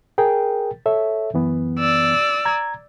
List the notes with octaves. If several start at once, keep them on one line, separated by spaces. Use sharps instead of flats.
G#4 A#4 G5
A4 C#5 E5
F#2 E3 B3
D5 E6
A#5 G#6